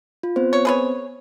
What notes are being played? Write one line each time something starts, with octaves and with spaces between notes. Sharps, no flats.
F4
B3 C4 C5
C#5
G#4 B4 C#5